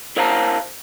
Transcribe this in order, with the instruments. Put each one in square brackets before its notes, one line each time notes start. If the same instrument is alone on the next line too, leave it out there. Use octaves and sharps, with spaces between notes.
[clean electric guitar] E4 A#4 C5 F5 A5 A#5